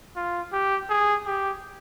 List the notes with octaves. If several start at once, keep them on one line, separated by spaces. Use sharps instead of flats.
F4
G4
G#4
G4